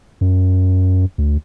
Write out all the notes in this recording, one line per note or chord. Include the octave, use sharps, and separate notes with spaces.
F#2
D2